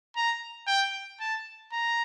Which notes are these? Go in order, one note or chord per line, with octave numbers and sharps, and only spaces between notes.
A#5
G5
A5
A#5